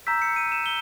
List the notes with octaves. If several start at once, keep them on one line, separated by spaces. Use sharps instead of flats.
A#5 E6 G6 B6
C#7
D#7
E7
G7